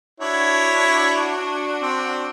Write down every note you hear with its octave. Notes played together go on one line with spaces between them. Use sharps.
D4 E4 F#4 C#5
C4